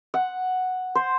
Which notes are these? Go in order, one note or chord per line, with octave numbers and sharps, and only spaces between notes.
F#5
C5